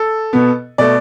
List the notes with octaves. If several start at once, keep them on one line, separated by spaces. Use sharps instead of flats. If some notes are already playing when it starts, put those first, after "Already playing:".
Already playing: A4
B2 B3
B2 A3 D5